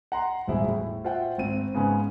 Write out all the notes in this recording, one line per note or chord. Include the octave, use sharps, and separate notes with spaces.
F#5 A#5 C6
D#1 G#1 E2 E4 G#4
A2
F4 C5 E5 F#5 G5
G#1 C4 D#7
G#2 C#3 B3 C#4